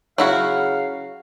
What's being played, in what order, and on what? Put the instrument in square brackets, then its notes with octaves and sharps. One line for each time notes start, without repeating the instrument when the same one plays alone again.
[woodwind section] C#3 F5 [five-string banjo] F#3 E4 F#4